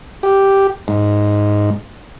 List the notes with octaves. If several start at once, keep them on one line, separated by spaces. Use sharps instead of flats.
G4
G#2